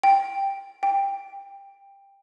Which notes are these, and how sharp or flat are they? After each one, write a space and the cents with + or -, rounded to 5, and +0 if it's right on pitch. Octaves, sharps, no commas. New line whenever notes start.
G5 +5
G5 +15